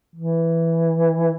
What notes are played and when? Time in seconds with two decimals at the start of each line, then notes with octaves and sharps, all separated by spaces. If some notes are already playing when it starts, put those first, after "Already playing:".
0.16 E3